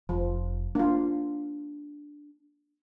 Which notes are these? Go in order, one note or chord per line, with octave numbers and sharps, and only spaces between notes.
F1 F3
A#3 D4 F4